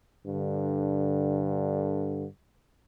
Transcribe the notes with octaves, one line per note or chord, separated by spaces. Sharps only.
G2 D3